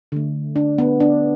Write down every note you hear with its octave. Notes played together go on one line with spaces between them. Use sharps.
D3 A3
D4
B3
D4